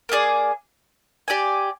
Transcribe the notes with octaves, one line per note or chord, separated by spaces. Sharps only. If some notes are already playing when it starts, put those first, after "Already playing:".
A#3 D4 G#4 D5
G4 D5 G#5